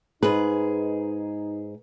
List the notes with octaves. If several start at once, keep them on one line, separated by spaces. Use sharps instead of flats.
G#2 D#4 G#4 B4